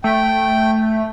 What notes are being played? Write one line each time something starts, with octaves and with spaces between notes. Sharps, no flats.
A3 G5